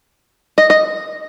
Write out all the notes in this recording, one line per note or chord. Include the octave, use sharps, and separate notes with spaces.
D#5
D#5